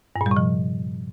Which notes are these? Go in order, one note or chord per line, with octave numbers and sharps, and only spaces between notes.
G2
A#2
G3
C3
F3